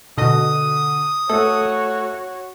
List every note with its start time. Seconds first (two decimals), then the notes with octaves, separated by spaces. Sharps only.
0.18 B2 D3 D#5 D#6
1.30 A3 F#4 A4 C#5